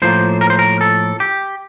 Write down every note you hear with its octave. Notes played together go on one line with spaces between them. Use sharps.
A2 F3 A#3 C5
A#4
C5
A#4
A4
G4